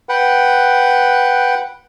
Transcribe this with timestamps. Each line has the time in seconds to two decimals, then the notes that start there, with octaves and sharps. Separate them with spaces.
0.09 B4 F#5 G5